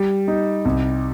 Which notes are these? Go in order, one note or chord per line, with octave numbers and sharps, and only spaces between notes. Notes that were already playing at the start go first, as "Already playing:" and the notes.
Already playing: G3
D#4
C2